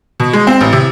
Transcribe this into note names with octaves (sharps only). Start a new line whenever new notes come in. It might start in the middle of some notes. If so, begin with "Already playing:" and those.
B2
G#3
C4
A1
C3